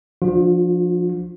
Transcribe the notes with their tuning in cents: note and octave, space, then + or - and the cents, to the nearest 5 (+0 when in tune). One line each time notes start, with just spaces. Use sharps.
F3 +0 D4 +10 F4 +45